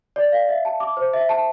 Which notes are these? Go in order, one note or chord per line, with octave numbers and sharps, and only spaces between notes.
D5
F5
E5
A5
D6
C5
E5
A5